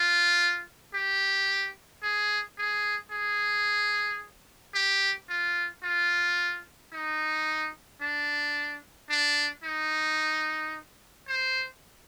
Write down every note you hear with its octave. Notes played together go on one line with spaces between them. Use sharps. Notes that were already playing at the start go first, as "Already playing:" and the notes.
Already playing: F4
G4
G#4
G#4
G#4
G4
F4
F4
D#4
D4
D4
D#4
C5